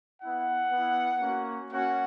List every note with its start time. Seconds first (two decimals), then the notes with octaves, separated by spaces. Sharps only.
0.22 B3 E4 F#5
0.72 B3 E4
1.21 A#3 C#4 F#4
1.71 A#3 C#4 F#4 F#5